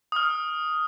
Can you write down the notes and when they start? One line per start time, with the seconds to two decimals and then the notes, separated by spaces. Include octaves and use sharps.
0.12 D#6 F6